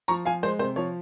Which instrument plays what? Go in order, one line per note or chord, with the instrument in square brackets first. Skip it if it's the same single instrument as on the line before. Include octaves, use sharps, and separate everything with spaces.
[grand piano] F3 A#5 C#6
F3 F5 G#5
G#3 C5
C3 C5
F3 C#5